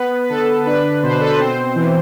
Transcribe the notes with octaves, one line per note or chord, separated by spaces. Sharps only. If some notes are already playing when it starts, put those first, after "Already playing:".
Already playing: B3 B4
B4
D3 A4
D4 B4
B2 C5
B4
A4
B4
C4 C5
E3